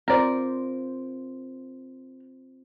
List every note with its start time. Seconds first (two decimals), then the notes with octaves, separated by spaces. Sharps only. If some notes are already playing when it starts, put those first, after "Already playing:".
0.08 C4 F4 A#4 C5 D5